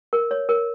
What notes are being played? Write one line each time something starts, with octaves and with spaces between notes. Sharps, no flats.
A#4
C#5
A#4